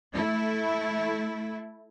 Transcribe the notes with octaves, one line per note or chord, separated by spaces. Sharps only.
A3 E4